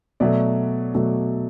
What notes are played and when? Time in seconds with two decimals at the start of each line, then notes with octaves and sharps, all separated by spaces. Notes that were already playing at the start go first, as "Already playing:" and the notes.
0.20 B2 F#3 A3 D5 E5
0.94 B2 F#3 A3